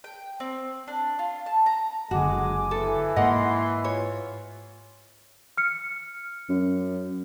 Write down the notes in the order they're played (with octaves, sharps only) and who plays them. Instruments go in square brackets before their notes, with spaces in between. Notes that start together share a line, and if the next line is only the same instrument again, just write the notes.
[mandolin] G5
C4
D4
F4
A5
A#5
[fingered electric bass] F#1 D3 [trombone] G#3 [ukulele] F#4 [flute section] G#5 D6
[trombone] E3 [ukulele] A4
[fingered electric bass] G#2 A#3 [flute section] E4 C6 [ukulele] A#4 D#5 F#5
[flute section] F4 [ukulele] C#5
[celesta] F6 C#7
[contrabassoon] F#2